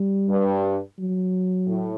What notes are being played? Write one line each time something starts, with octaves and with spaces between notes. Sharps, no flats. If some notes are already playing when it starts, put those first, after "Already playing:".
Already playing: G3
G2
F#3
A2